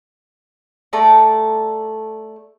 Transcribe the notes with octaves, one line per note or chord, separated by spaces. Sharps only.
A3 A4 D5 A#5